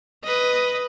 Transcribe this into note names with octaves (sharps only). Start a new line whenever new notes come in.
B4 D#5